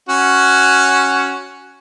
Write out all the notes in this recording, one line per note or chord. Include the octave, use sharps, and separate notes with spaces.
C#4 F#4